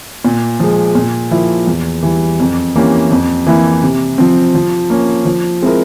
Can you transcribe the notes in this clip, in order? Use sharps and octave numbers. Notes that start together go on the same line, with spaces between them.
A#2
F3 G#3
A#2
F3 A#3 E4
E2
E3 G3
F2
E3 A#3 C#4 G4
F2
E3 A#3 E4
C3
F3 C4
F3
A#3 C#4
F3
G#3 C4 E4 A#4